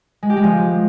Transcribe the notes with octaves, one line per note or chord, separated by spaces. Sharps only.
G#3
G4
G#3
F3